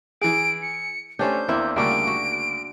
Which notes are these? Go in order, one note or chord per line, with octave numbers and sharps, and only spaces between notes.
E3 G#4 D7
C#7
A3 C#4 D4 G4 C5 G6
E2 A#3 C4 E4 E5 B5
D2 C#3 G3 A#3 D4 F#4 D7
F#4